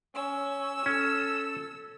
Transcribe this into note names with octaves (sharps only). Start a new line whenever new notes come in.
C#4 E6
C#4 A4